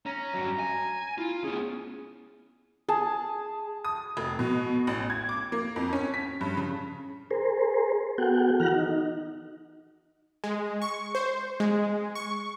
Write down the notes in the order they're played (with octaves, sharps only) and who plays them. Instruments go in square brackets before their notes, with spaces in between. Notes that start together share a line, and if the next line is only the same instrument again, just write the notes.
[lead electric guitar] C#4 [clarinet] A#5
[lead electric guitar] G2 F#3
G#5
[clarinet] E4 [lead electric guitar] F4
[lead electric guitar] B3 C#4 [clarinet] G#4
[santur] G#4 A5
[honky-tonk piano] D#6
F1
B2
A1
G#6
D6
A#3
F2
C#4
B6
G2
C#3
[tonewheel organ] G#4 A#4 C5
B3 F#4 G#4 A4 F#5 G5
E3 F#4 F#5 A#5 F6 F#6
D#4
[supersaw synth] G#3
C#6
C5
G#3
C#6